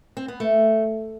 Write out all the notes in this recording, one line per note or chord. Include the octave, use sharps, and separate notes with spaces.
C4
B3
A3